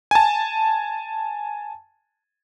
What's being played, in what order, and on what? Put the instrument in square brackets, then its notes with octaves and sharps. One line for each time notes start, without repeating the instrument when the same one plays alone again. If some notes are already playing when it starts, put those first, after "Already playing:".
[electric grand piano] G#5 A5